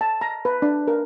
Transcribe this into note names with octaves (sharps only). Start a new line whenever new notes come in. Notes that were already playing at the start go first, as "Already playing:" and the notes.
A5
A#5
B4
D4
A#4